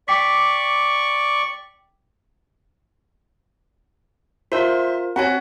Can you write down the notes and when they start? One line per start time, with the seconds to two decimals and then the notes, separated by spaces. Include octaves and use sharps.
0.08 D5 G5 C#6 D6 B6
4.52 F4 A#4 C5 E5
5.16 C4 F#4 C#5 F#5 G#5